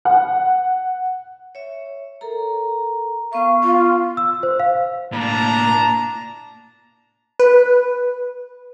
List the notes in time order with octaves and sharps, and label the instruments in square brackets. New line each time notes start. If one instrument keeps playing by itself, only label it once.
[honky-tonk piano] F#5
[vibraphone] C#5 E5
A4 A#4 A#5
[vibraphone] B3 C#6 [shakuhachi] F5
[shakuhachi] F4
[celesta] E6
C5
F5
[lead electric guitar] A2 A#3 [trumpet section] D4 A5 A#5
[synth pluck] B4